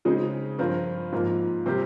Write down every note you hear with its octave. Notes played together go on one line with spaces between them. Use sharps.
C#3 G#3 C4 D#4 G#4
G2 F3 C4 F4 A#4
G#2 F3 A#3 F4 A#4
C3 G3 C4 G4 A#4